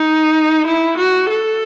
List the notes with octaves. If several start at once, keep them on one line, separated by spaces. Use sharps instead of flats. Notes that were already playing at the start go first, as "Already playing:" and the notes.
Already playing: D#4
E4
F#4
A4